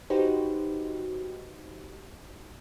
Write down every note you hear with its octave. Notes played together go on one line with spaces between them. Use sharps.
D#4 F#4 G4 B4 C5